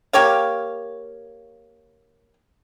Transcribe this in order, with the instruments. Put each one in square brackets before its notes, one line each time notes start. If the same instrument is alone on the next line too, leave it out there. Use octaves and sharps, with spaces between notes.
[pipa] A#3 G4 C#5 F5